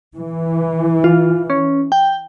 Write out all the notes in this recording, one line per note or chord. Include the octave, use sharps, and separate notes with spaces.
E3
F4
C#4
G5